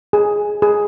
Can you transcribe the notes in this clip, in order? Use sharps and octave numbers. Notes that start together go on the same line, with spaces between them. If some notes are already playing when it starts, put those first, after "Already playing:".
G#4
G#4